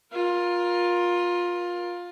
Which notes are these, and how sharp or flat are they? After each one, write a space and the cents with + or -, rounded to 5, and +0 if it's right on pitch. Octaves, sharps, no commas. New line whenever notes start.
F4 +15 A#4 +30